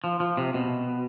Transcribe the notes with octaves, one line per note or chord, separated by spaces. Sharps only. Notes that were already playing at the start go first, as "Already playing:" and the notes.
F3
F3
C3
B2